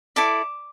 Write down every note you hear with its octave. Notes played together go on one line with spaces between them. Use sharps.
E4 A4 D5 D6